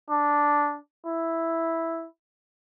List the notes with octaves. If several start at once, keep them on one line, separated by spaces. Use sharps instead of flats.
D4
E4